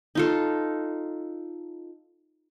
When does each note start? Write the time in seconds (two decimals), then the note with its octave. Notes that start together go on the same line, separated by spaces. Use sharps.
0.15 D#4 F4 A4